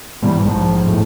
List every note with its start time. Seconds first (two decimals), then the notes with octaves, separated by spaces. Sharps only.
0.22 G#2 B2 E3 G3
0.44 A#1 G#2 F3
0.86 E1 A2